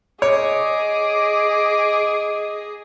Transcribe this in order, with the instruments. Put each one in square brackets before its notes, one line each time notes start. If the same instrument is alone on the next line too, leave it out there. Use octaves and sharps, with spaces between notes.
[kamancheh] G#4 [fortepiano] C#5 [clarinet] D#5 [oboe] D6